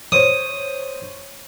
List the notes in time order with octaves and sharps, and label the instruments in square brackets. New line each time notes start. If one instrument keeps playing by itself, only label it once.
[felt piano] C5 C#5 [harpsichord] D#6